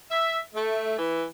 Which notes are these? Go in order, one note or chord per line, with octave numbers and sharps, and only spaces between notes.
E5
A3
E3